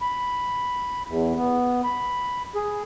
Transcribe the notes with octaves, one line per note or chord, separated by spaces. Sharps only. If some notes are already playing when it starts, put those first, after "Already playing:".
B5
E2
B3
B5
G#4